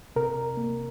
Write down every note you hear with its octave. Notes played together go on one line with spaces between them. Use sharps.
C3 A#4
A#3